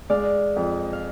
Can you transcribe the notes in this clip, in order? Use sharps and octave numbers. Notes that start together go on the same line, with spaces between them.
G#3 D5 F5
F2
F5